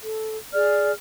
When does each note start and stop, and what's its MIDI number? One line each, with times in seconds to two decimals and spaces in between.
0.01 0.37 69
0.53 0.92 68
0.53 0.92 74
0.53 0.92 89